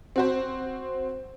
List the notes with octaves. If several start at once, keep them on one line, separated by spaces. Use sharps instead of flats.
C4 F#4 C5